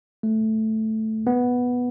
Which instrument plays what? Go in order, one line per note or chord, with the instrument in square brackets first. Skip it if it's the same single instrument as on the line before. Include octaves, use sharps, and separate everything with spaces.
[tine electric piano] A3
B3